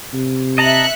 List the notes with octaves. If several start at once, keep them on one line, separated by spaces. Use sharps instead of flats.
C3
D#5 E5 A5 A#5 F#6 C#7